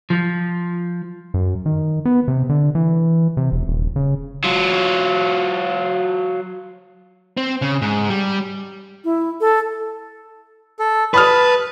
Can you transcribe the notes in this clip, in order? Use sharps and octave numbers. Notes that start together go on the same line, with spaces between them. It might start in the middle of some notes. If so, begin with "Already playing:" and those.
F3
F#2
D#3
B3
C3
D3
E3
C3
E1
D#1
C#3
F#3 F4
C4
C#3
G#2
G3
E4
A4
A4
B4 A5 B5 D#6 F6